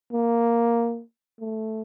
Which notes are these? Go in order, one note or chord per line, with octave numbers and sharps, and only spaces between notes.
A#3
A3